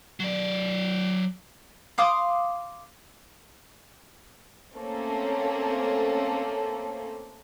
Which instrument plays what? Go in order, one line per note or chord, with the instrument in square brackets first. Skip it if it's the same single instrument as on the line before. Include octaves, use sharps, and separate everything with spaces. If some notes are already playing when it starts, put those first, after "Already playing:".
[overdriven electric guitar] F#3 D5
[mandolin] F5 C6 D6 D#6
[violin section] A3 A#3 C4 C#4 A4 C#5